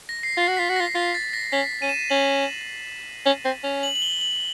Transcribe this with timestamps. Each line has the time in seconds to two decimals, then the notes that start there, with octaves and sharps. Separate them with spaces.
0.09 A#6
0.23 C7
0.37 F4 C7
0.48 F#4
0.57 F4 B6
0.69 F#4
0.76 F4 A#6
0.95 F4 C7
1.15 A6
1.33 A#6
1.52 C#4 B6
1.82 C#4 D#7
1.89 E7
1.97 D#7
2.10 C#4 F#7
3.26 C#4
3.45 C4
3.64 C#4
3.83 F#7
3.95 F#7
4.02 G7
4.21 F#7